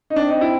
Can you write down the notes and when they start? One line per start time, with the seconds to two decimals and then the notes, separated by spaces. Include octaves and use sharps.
0.10 D#4
0.16 C4 D4
0.28 D#4
0.41 E4